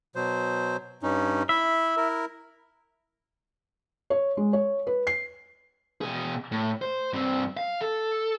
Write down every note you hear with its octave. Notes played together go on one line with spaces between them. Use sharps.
B2 F#3 C5
G2 C#4 D#4
E4 E5 B5
E4 A#4
C#5
G#3
C#5
B4
C7
B2 G#4
A2
C5
G2 C4
F5
A4